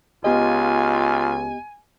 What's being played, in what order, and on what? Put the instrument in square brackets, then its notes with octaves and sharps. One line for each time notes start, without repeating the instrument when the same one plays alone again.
[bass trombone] C#2 [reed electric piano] B3 G4 D#5 [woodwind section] F4 [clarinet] G#5